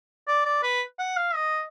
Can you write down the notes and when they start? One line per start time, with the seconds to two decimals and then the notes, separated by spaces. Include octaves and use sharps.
0.28 D5
0.46 D5
0.63 B4
0.99 F#5
1.17 F5
1.35 D#5